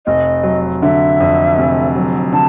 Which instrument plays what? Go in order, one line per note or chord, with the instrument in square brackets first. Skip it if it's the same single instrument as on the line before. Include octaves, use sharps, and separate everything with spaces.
[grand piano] F1 [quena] D#5
[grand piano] F#3
[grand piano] D3 [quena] E5
[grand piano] F2
F1
F#3
[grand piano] D3 [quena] A5